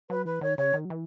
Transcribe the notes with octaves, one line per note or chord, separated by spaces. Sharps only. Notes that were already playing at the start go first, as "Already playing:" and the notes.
F#3 B4
E3 B4
D#3 C#5
C#3 C#5
D#3
F#3
E3